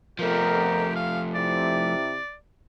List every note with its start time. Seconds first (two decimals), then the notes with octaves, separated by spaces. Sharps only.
0.19 F2 F3 A3 B3 G4 A#4
0.96 F5
1.35 C3 E4 D5